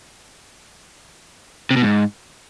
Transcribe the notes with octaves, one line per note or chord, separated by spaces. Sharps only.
C3
B2
G#2